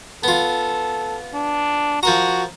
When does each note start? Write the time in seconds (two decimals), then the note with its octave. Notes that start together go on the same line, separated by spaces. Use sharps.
0.24 B3 F4 A4
1.34 D4
2.03 F3 F#4 A#4 A#5